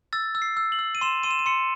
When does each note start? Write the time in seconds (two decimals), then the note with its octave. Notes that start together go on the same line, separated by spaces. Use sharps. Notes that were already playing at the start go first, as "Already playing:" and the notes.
0.13 E6 A6
0.35 E6
0.42 C7
0.57 E6
0.72 F#7
0.79 E6
0.95 D#7
1.01 C6 E7
1.23 C6 D#7
1.31 E7
1.39 D#7
1.46 C6 C#7